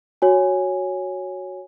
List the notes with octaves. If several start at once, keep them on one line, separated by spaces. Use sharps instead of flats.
F#4 C#5 G#5